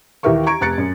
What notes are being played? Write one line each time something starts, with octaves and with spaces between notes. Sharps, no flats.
D#2 E3 G4 A#4 E5 C#6
A#5 C#6 G#6 D7
F1 A#5 F#6 A6 C#7
F#2